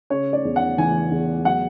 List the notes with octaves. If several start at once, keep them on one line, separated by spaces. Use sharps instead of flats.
C#3 C#5
D5
E2
F#5
E3 G#5
E2
F#3 F#5